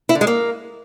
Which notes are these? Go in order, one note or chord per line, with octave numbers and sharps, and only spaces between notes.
E4
D3
G#3
A#3